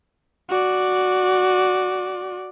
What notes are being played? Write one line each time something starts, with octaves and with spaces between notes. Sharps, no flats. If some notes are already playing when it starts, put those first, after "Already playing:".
F#4 D5